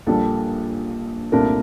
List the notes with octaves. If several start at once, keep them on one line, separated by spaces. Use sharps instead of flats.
A#1 A#2 G3 D4 A4
C2 A#2 A3 D4 A#4